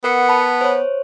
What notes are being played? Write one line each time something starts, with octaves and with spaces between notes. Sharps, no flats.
B3 A#4 F#5 C#7
A5 B5
C5 C#5